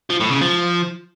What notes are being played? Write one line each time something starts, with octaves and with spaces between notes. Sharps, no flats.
F3
A2
C#3
F3